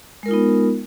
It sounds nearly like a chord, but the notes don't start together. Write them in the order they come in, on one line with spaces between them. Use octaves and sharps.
G#3 A#4 F4 D#4 B3